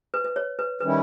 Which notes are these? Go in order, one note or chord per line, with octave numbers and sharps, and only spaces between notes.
B4
B4
C#5
B4
D#3 G3 C#4 E4 B4